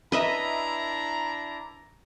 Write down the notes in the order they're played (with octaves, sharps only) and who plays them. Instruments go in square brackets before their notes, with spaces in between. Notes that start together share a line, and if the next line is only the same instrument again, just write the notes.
[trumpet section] D4 E4 A#5 [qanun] B4 D#5 E5